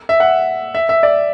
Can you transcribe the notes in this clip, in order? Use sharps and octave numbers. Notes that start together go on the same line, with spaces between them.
E5
F#5
E5
E5
D5